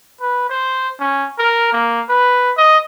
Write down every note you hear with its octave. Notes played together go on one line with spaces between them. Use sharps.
B4
C5
C#4
A#4
A#3
B4
D#5